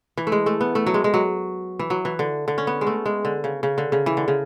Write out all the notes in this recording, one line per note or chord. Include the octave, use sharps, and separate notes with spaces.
E3
A3
G#3
A3
B3
A3
F#3
G#3
G#3
F#3
E3
F#3
E3
D3
D3
C#4
B3
G#3
A3
G#3
D3
C#3
C#3
D3
C#3
E3
D3
C#3